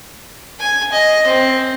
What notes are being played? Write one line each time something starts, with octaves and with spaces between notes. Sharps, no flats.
G#5
D#5
C4